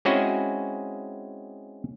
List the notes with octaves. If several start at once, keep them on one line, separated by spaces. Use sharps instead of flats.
G#3 C4 C#4 E4 F#4 G#4